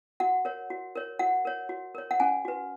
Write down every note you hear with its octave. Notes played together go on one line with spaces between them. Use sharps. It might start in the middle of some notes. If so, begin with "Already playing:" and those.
F#4 F#5
A#4 C#5
F#4
A#4 C#5
F#4 F#5
A#4 C#5
F#4
A#4 C#5
F#5
C#4 G#5
F#4 B4